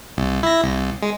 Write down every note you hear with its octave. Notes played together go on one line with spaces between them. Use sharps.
C2
E4 A#6
C2
G#3